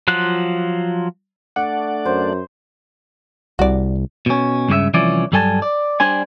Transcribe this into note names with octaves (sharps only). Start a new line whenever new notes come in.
F3 F#3 F4 F#6
A3 D4 D5 F#5
F#2 C5
C2 F#4 D5
B2 C#4
C#2 G2 C#3 G4 E5
C2 E3 F3 C#4 E4 D5
G2 F#3 G3 A4 G#5 A5
D5
G3 D4 C5 G#5